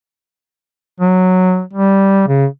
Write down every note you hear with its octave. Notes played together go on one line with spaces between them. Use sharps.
F#3
G3
C#3